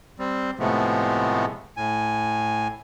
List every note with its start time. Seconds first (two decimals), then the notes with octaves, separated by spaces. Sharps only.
0.19 G3 C4
0.59 A2 C3 F3 G#3 A3 B3
1.77 A2 G#5